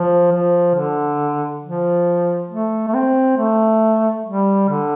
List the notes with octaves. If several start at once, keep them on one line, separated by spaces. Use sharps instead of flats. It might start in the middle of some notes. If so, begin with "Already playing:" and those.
Already playing: F3
F3
D3
F3
A3
A3
C4
A3
G3
D3